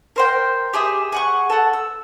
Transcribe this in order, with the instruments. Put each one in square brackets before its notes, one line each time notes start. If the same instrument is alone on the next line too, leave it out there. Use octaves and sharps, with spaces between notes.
[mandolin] A#4 C5 G5
G4 G#4 E5 D#6
G#4 F#5 C#6
A4 F#5
E6